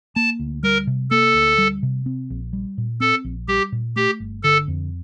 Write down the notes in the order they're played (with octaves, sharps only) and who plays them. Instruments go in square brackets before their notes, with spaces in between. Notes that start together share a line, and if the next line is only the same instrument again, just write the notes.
[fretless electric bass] A#3 [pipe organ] A5
[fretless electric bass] D2
[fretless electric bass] G3 [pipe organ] A#4
[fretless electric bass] C3
[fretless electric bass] A#3 [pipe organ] A4
[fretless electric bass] D2
G3
C3
C4
A#1
G3
A#2
[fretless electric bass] C4 [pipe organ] A4
[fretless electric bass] A#1
[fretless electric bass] G3 [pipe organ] G4
[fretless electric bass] A#2
[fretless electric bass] A3 [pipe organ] G4
[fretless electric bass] G1
[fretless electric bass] D3 [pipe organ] A4
[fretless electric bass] F2